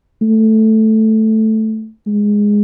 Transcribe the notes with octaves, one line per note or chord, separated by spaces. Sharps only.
A3
G#3